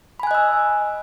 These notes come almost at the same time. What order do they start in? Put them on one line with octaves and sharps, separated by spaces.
B5 G#5 F#6 D#5 E6